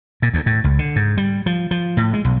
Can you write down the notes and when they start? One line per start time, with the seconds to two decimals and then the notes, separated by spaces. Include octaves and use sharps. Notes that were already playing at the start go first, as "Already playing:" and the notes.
0.22 A#2
0.34 D2
0.46 A2
0.64 C#2
0.79 D3
0.96 G#2
1.17 G3
1.46 F3
1.71 F3
1.97 A2
2.14 G#3
2.25 B1